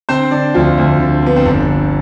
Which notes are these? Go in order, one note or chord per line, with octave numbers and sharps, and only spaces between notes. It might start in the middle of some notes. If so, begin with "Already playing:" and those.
D3 C4 C5
D3 D4 D5
D2 F3 F4
D2
D3
F3 B3
C4
G1 D3 D4
D3